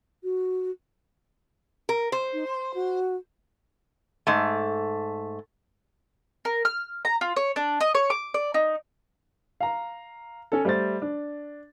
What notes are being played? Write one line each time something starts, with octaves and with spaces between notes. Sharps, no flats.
F#4
A#4
C5
D#4
C6
F#4
G#2 A3
A#4
F6
A#5
F4
C#5
D4
D#5
C#5
D6
D5
D#4
F5 A#5
C#4 A4
G3 A3 C5 E5 A6
D4